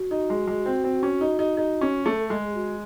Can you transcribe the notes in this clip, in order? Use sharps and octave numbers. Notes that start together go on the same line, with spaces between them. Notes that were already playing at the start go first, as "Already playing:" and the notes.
Already playing: F#4
D#4
G#3
G#3
C4
C4
C#4
D#4
D#4
D#4
C#4
A3
A4
G#3 G#4
F#4